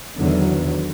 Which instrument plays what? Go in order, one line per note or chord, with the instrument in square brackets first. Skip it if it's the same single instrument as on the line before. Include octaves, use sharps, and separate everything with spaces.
[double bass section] E2 D3 D#3 F#3